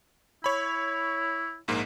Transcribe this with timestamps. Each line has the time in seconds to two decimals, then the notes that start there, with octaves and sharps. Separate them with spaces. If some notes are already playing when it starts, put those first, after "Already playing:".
0.44 E4 C#5 B5
1.68 A#1 G#2 A#3